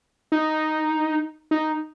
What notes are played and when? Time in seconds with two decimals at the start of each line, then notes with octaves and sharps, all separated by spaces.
0.32 D#4
1.51 D#4